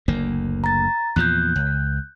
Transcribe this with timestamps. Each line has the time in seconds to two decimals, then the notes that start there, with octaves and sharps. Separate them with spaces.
0.08 F#1 D2 A#3
0.64 A#5 A6
1.16 E2 A#2 F3 F#6 G6
1.56 C#2